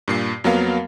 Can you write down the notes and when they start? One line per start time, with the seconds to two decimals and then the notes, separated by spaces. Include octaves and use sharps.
0.08 G2 A#2 C7
0.44 F2 F#3 A#3 B3 A#4 F5